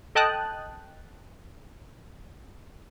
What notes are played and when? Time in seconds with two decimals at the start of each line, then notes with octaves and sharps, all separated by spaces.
0.15 A4 D#5 G5 A5 D#6 F#6